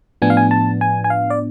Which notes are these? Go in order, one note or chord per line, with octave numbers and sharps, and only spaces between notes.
A2 F3 B3 D4 G#5
F5
G#5
A5
G#5
G#5
F5
D5